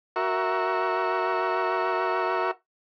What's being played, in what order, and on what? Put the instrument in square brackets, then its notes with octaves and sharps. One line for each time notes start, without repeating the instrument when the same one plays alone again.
[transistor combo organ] F#4 A#4 E5 C#6